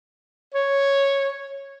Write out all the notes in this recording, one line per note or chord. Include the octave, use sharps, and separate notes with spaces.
C#5